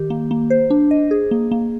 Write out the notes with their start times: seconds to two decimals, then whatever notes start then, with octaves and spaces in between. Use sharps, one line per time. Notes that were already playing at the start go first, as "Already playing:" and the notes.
Already playing: D#3 G4
0.10 A#3
0.31 A#3
0.50 C5
0.70 D4
0.91 D#5
1.11 G#4
1.31 A#3
1.51 A#3